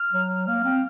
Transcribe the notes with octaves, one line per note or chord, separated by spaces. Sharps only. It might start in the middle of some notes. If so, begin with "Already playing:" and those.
Already playing: F6
F#3
A#3 F6
C4